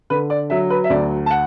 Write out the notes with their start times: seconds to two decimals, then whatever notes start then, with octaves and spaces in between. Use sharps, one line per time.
0.10 D3 B4
0.30 D5
0.50 F#3 E5
0.70 B4
0.84 E5
0.90 D2 D5
1.26 A5
1.31 F#5